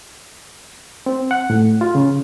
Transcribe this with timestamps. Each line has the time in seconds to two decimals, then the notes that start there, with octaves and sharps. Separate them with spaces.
1.06 C4
1.31 F#5
1.50 A2
1.81 F4
1.95 C#3